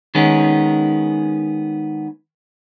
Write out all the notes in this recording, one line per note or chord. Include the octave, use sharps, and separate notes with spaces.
D#3 G#3 B3 C#4